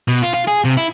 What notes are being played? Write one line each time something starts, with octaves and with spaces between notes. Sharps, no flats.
B2
F4
F4
G#4
C3
E4